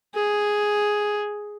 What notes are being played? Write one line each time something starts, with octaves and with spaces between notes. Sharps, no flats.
G#4